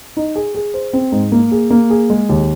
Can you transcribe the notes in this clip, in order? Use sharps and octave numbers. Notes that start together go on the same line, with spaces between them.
D#4
G#4
G#4
C5
C4
G#2
A#3
G#4
A#3
G#4
G#3
D#2